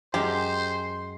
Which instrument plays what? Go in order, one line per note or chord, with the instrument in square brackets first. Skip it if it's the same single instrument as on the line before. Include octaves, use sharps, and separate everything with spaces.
[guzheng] F#2 G#3 E5 [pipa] G4 [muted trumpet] C5 [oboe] C6